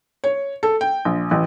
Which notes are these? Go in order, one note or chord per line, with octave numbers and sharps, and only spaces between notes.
C#5
A4
G5
A#1
A1